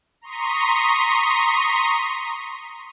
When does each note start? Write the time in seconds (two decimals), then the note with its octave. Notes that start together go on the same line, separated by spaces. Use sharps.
0.21 A#5 C6 C#6 D#6 B6